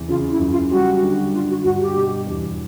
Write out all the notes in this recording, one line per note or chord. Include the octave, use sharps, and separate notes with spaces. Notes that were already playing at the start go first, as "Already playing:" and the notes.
Already playing: E2 C3
C#3 F4
E4
F#2
F4
G3 F#4
D3
D3 F4
F#4
G2 F#4
G4
B2
E2